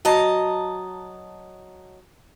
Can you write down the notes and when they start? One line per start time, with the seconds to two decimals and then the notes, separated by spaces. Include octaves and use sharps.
0.05 F#3 D#5 A5 A#5